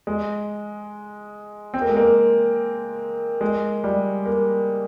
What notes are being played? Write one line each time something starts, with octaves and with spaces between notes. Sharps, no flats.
G#3
C4
A#3
G#3
A#3
G#3
G3
A#3